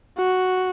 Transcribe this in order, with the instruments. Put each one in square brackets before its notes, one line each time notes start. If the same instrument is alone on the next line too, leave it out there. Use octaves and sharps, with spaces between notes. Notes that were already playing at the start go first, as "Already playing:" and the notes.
[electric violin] F#4